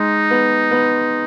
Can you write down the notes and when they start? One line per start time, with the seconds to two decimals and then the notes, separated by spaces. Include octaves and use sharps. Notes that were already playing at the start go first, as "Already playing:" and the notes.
Already playing: G#3 D#4
0.31 B3
0.71 B3